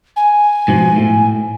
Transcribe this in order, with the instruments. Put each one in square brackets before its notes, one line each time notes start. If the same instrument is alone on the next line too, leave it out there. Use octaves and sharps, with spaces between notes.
[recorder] G#5
[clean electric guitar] G#2 B2 F3
A2